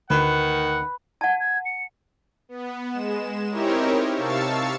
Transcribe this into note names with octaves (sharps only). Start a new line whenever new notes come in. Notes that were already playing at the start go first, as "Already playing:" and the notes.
D2 D#3 B4 F#5
F#5 A5 G#6
G#6
C#7
B3
G#3 E7
C4 D#4 E4 G4 A#4 C#5
C3 F5 A5 C#6 E6 A6